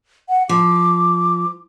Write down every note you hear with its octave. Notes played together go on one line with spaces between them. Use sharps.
F#5
F3 D6